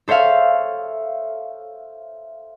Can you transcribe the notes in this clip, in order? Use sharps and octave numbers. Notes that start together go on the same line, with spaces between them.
A4 C5 C#5 E5 F5